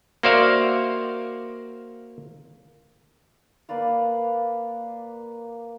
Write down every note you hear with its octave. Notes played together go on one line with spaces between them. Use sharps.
A#3 F#4 C5 D5 E5 F5
A#3 B4 D5 F5